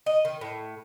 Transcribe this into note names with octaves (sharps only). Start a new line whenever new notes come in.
D#5
D#3
A2